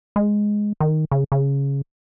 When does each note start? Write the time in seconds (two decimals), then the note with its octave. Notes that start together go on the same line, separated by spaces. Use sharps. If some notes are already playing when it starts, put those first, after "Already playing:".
0.16 G#3
0.80 D#3
1.11 C#3
1.32 C#3